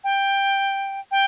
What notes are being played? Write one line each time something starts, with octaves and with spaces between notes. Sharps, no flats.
G5
G5